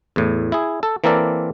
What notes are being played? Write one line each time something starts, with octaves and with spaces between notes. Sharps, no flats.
E2 A2
E4 G#4
A4
E3 A#3 C4 A4 A#4 D5